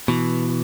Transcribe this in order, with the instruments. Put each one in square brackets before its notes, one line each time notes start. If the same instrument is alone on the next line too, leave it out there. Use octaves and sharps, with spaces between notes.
[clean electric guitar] B2 [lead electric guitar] E3